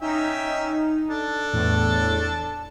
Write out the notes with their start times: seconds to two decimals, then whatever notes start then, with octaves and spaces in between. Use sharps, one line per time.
0.01 C#4 D#4 E5 G5
1.09 D4 A4
1.53 E2 A2
2.20 A5